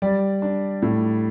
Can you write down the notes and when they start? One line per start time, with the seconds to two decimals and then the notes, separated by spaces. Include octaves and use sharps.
0.02 G3 D5
0.42 D4
0.82 A2